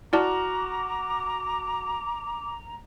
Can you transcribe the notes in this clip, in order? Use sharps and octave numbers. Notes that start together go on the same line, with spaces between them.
E4 F#4 D5 A5 A#5 D6 F6